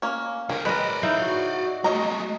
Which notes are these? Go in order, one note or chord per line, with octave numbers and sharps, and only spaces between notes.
A#3 C#4
D3 G#4 A#4
G#3 A#4 B4 D5 D#5
D#4 E4 F5 G6
F#4
G#3 A3 D#5 A#5